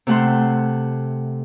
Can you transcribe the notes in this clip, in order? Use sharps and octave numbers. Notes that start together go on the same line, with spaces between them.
C3 A3 F#5 A5 C6